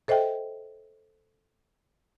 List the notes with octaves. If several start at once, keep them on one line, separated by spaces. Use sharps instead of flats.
A4 C5 D#5 E5 G5